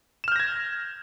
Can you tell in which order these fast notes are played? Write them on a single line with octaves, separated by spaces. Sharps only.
E7 F6 G6 A#6 G#6